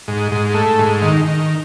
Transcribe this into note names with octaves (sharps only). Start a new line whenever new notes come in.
G#2
G#2
A3
G#2
D#3
D#3